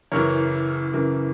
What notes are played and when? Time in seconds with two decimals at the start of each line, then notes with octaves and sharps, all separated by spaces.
0.12 F#1 F#2 C#3 E3 A#4 C#5
0.93 F#1 F#2 C#3 E3 A#4